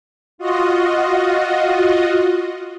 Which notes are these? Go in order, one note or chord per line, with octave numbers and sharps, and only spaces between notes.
F4 F#4 D#5